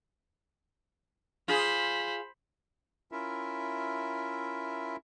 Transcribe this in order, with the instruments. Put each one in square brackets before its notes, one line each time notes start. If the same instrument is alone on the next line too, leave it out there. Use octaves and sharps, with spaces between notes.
[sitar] F4 G#4 [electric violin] C5 B5
[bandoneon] C#4 E4 F4 A#4 E5